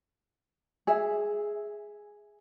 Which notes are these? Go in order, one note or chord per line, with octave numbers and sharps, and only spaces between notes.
G#4 E5